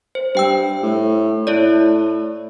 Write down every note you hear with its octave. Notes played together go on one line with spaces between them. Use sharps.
C5
G2 C5 G5 E6
A2
A2 E4 C#5 D5